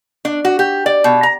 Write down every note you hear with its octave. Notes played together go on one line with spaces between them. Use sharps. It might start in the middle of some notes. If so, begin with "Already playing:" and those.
D4
F#4
G4
D5
B2
A#5